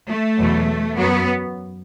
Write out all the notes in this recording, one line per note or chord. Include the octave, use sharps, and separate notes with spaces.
A3
E2 B2 F#3
F#2 F#3 B3